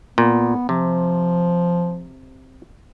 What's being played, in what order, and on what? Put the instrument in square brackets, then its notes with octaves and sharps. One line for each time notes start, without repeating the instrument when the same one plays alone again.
[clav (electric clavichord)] A#2 [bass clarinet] B3
[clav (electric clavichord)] C3 [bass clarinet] F3